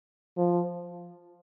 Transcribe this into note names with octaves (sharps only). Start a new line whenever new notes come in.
F3